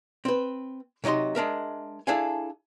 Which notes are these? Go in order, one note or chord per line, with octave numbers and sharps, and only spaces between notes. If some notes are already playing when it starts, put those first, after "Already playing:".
C4 B4
C3 F#3 D#4 D#5 C6
G#3 D4 A#4 E5
D4 E4 G#4 A4 F5 G#5